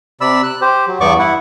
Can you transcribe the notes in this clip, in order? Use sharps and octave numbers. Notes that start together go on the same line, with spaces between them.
C3 D5 B5 E6
F#6
G4 C5
F#3
E2 G2 B3 D5 C#6 D6
E4 F#5